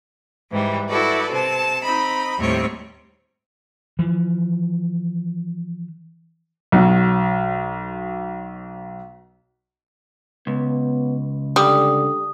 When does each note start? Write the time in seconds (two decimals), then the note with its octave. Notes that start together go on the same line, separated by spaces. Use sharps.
0.49 G#2 E3 G3
0.88 E4 F#4 A4 B4 D5
1.30 C3 C4 A5
1.83 C4 D#4 B5
2.38 D#2 A2 G3 C4 C#5
3.99 E3 F3
6.72 B1 F#3
10.47 C#2 B3
11.56 D3 G3 D#6